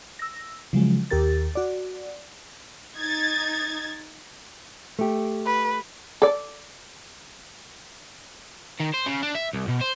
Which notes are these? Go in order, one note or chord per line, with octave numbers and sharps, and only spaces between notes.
E6 A#6
C#3 F3 F#3 G#3
D#2 G4 A#4 A6
F#4 D5
D#4 G#6 A6
A3 G4
B4
A4 D5
D#3
C5
C#3
D4
E5
C2
B2
C5